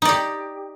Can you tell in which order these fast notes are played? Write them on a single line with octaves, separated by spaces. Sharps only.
D#4 D5 G4